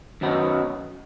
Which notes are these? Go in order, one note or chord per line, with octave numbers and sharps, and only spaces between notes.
F#2 D#3 F#3 B3 D#4